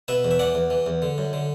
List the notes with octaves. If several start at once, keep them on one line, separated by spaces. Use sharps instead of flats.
B2 B4 E5
E2
E5
E3 D5 F#5
E2
E3
E2
D3
F#2
D3